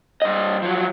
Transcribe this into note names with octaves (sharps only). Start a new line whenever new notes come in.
G2 D#5
F3 F#3